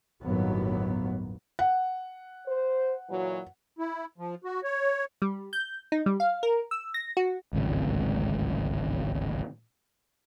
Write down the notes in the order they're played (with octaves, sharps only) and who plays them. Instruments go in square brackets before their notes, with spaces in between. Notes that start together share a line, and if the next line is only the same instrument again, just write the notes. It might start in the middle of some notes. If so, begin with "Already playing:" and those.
[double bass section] G1 D#2 A2 F#3 B3
[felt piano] F#5
[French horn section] C5
A#2 E3 F#3
[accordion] E4
F3
F#4
C#5
[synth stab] G3
G6
D#4
G3
F5
A#4
E6
A#6
F#4
[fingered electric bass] D1 G#1 C#2